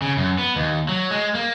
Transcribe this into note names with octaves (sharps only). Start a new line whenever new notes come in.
C#3
F#2
B3
D#2
F#3
G#3
A#3